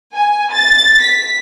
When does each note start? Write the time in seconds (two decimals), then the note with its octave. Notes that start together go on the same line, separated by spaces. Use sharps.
0.14 G#5
0.53 A6
1.01 B6